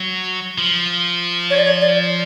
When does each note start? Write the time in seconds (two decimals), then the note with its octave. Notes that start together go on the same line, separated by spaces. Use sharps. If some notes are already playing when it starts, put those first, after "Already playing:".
Already playing: F#3
0.58 F3
1.50 C#5
1.57 D5
1.65 C#5
1.81 D5